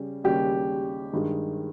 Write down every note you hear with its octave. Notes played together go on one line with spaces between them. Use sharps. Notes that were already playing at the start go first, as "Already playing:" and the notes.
Already playing: C#3 G3
D#2 C#3 G3 G4
G2 D#3 G#3